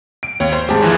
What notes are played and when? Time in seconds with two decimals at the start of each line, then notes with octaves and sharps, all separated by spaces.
0.23 D7
0.40 D#2 C#5
0.53 C5
0.69 G#2 G4 G#4 A5
0.82 D#2 E3 F3